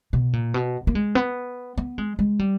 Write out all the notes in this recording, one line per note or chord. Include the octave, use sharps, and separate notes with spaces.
B2
A#2
B2
A#3
G#3
B3
B3
G#3
G#3
G3